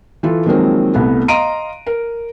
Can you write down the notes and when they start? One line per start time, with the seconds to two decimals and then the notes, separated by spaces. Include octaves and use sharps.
0.23 E3 F4 A4
0.46 D#3 F3 F#3 G#3 A#3 C4
0.94 C2 A3 B3
1.28 D#5 F5 A#5 C6 D7 D#7
1.87 A#4